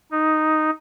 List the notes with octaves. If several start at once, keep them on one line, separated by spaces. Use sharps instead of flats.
D#4